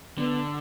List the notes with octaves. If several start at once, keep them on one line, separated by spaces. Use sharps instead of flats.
D3 B3